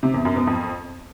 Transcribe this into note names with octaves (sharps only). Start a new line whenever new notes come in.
C3
E2
F#2
B2
F2